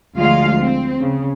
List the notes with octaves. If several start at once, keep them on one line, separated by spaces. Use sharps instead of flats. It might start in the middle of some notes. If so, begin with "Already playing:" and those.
D2 F3 G#3 F4 F5
C4
C#3